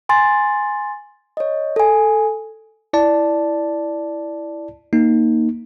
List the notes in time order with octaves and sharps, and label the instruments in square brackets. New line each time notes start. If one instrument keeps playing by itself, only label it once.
[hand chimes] G#5 C6 A6
C#5 D#5
A4 G#5
[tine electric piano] E4 D5 A5
A#3 D#4